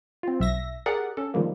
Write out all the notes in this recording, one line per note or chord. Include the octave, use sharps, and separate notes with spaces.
C4 F4
B1 E5 A#6
G4 G#4 A#4 D5 F#5
C#4 A4
D#3 F3 G3 G#3 A#3